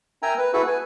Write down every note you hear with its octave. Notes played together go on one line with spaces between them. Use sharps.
A#4 E5 G5 G#5 A#5
B4
E4 F#4 G#4 A4 B4 E5
B4 G#5